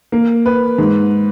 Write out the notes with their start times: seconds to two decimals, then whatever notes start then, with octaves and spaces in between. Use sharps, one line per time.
0.12 A#3
0.46 B4
0.78 G#2